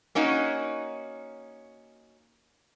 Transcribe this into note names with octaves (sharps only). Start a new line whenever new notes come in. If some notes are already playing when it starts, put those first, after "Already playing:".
A#3 C#4 D#4 F#4